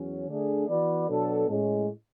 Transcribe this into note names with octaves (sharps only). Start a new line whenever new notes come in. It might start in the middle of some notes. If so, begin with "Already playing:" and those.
Already playing: E2 F#3 C#4
D3 A3 D4 G#4
E3 B3 F#4 B4 D5
B2 F#3 B3 D4 A4
A2 G#3 C#4